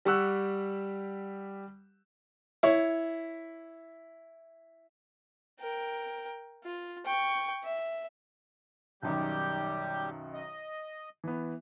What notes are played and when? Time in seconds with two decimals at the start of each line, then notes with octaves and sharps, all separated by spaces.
0.05 G3 G4 F#5 C#6 E6 F#6
2.63 E4 C#5
5.59 A#4 G5
6.64 F4
7.06 G5 C#6
7.64 E5
9.03 B1 F#2 D#3 G3 G4 G6
10.33 D#5
11.24 E3 B3